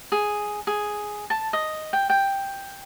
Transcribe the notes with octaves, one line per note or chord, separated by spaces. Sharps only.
G#4
G#4
A5
D#5
G5
G5